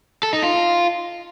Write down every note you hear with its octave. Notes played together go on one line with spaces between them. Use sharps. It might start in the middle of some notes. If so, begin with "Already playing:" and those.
A4
D#4
F4